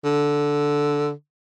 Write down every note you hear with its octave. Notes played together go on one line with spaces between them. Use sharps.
D3